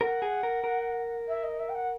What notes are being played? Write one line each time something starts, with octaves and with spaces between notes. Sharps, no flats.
A#4 F#5
G#4
A#4
A#4
E5
D#5
E5
G5
F#5